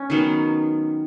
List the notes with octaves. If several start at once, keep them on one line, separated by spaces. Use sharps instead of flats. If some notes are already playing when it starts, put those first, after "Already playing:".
Already playing: C#4
D#3 F#3 B3